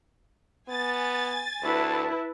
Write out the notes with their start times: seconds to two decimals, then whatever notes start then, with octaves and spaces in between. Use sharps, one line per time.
0.68 B3 G#5 A6
1.62 D2 E4 B4 A5